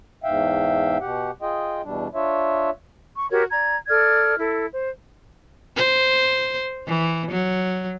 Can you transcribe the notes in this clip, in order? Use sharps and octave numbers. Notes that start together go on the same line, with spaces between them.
E2 G#2 E5 F5 G5
B2 G4 F#5
F4 G#4 D#5 G5
E2 B2 G3 D4
D4 F4 C#5 E5
C#6
F#4 G4 A#4 C#5
D5 A#5 G#6
A4 D5 F6 G#6
E4 A4
C5
C5
E3
F#3